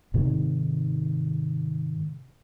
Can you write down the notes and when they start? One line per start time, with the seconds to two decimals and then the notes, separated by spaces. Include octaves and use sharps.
0.14 G#2 C3 D#3 G#3